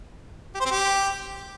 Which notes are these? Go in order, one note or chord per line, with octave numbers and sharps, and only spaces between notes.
G4
C5
C4
G4